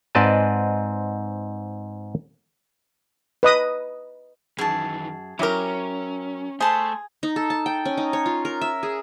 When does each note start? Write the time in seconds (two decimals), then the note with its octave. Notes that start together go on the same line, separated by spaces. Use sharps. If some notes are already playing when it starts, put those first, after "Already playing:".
0.15 G#2 C4 B4 D5 D#5 A5
3.43 B4 D#5 D#6
4.58 F#2 D#3 E3 G#4 A5
5.39 F#3 C#4 E4 G4 A#4
6.60 A3 G#4 C5 A5 C6
7.23 D#4
7.36 A4
7.50 A5
7.66 G5
7.85 C#4
7.97 D#4
8.13 C#5
8.26 F4
8.45 A#4
8.61 E5
8.83 G#4